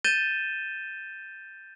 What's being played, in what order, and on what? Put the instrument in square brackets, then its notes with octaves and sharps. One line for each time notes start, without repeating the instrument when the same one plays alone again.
[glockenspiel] G6 A6 D#7 E7 G7